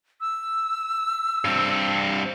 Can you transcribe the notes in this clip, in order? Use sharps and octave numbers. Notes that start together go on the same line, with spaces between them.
E6
G2 C4